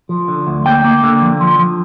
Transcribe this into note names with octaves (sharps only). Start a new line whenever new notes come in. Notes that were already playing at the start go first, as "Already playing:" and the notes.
F3
D3
D2
A#3 G5
A#3
D3
F3
F3
F3